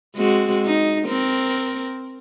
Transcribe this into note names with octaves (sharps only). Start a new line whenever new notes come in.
G#3 C4 F#4
D#4
C4 A#4